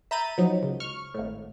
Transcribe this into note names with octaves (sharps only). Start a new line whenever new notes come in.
E5 A#5 B5 G6 A6 D#7
F3 F#3 D#4
C#2
C#6 F6
G#1 A2